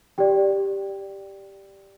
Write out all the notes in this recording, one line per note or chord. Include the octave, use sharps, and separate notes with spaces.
G4 D5 G5